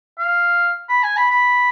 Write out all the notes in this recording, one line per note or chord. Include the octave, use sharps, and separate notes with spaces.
F5
B5
G#5
B5
B5